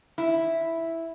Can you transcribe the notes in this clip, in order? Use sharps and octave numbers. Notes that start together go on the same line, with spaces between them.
E4